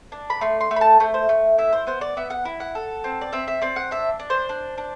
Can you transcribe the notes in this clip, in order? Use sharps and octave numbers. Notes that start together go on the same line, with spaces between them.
D4
B5
A3 C6
C6
A3
B5
A5
A3 C5
C5
A3
E4 E5
C5
B3 C5
D5
B3 E5
F#5
E4
F#5
A4
C4
D5
C4 E5
E5
C4 D5
F#5
D4 E5
D4
C5
D4
D4